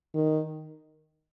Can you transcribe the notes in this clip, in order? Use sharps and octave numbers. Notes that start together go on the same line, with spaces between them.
D#3